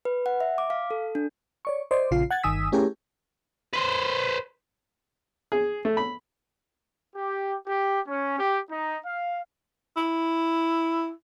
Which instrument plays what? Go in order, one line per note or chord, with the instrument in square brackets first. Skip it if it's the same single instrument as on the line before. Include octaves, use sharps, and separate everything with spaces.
[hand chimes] B4
F#5
E5
D6
F5
A4
D4
[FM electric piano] C#5 D5 C#6
C5 D5 D#5 C6
A#1 C#3 F4 C7
F#5 G#6 A6
G1 D#3 G#5 D#6 E6 B6
A3 C#4 E4 G4 G#4 A#4
[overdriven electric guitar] B4 C5
[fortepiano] G#4
A3
B5
[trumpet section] G4
G4
C#4
G4
D#4
F5
[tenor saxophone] E4